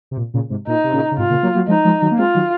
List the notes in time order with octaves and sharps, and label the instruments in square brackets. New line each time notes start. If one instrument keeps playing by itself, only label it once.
[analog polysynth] C3
A#2
A#2 C#3
G#2 C3
[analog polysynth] A#2 [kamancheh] D#4
[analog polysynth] C3
A#2 C#3
C#3
[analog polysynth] G#2 C3 [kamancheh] F4
[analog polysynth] A#2 C#3
F#3 A#3
F#3 A#3
[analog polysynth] F3 G#3 [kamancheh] D#4
[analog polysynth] F3 G#3
D#3 F#3
A#3
[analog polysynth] G#3 C4 [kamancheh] F4
[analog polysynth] D#3 F#3